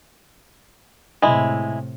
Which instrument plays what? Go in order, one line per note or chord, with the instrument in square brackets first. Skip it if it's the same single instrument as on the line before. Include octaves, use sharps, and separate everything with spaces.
[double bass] A2 C3 [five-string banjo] G#3 E4